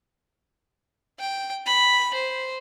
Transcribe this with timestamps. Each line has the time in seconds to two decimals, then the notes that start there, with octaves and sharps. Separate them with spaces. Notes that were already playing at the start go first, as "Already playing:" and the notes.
1.19 G5
1.66 B5
2.14 C5